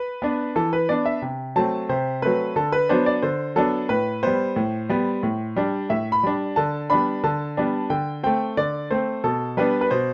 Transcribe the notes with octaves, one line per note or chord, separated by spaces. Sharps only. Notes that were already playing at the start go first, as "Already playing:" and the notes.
Already playing: B4
B3 D4
E3 A4
B4
B3 D4 D5
E5
C3
F#3 A3 C4 A5
C3 C5
F#3 A3 C4 B4
D3 A4
B4
F#3 B3 D4 C5
D5
D3 C5
F#3 B3 D4 A4
A2 B4
G3 B3 C5
A2
G3 B3
A2
G3 D4
A2 E5
B5
G3 D4
D3 A5
G3 B3 D4 B5
D3 A5
G3 B3 D4
D3 G5
A3 C4 G5
D3 D5
A3 C4 C5
B2 A4
G3 B3 D4 B4
B4
B2 C5